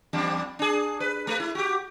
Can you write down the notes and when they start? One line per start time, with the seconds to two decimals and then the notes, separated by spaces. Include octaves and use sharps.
0.13 E2 G3 D4
0.59 D4 G#4
1.00 B4
1.27 A3 A#4 B4
1.40 E4
1.55 F#4 G4